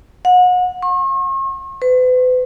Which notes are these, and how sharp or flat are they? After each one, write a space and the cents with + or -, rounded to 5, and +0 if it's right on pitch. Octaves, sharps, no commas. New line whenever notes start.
F#5 -35
C#6 -45
B4 +40